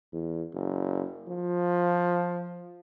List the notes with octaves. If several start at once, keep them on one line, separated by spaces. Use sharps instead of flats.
E2
F#1
F3